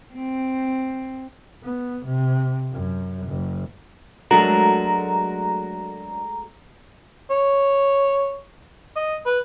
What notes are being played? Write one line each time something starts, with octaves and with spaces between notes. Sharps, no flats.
C4
B3
C3
F#2
F#1
F#3 G#3 A3 D4 F#4 A#4 A#5
C#5
D#5
B4